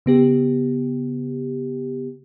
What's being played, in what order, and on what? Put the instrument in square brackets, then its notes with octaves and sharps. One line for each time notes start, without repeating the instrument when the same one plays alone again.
[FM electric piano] C#3 B3 G4